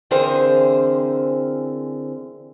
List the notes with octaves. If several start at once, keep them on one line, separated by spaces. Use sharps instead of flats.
D3 E3 C4 G#4 A#4 C5